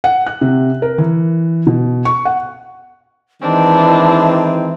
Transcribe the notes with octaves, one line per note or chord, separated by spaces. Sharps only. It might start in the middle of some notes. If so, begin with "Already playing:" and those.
F#5
F#6
C3
A#4
E3
B2
C#6
F#5
D#3 E3 G#3 C4 D4